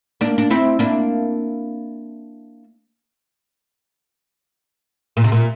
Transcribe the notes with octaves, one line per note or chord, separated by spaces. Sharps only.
A#3 D4
D4
C4 E4
A#3 D4
A#2
C3
A#2